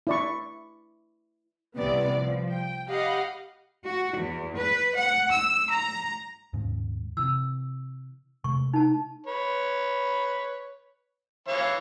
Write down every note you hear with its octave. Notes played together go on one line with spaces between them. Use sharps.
E4 D5 C#6
C2 C3 E3 B3 D5
F3
G5
G4 D#5 F5 F#5 B5
F#4
E2
B4
F#5
E6
A#5
D#1 G#2 C#3
C3 E3 E6
C3 G#3 A3 C#6
D#4 A5
B4 C#5
E3 C#5 F5